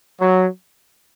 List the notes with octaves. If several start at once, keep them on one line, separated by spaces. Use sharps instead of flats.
F#3